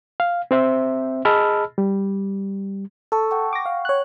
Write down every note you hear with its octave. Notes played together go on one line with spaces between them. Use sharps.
F5
C4 C5 E5
G#4 D#5 A5 B5 E6 F6
G3
A4 A5 C#6 E6
F#5 G5 C#6
D6 A#6
F5
C#5 F#6